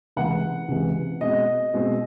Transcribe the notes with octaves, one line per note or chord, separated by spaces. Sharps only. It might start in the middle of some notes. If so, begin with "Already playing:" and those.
C#2 C3 E3 G#3 F#5
C#2 C3 E3 G#3
B2 G#3 C4 D#5
B2 G#3 C4